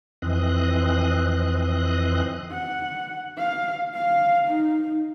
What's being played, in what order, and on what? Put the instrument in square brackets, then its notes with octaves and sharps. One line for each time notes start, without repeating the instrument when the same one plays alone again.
[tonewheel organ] F2 E3 C4 D#5 F#6
[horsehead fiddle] F#5
F5
F5
D#4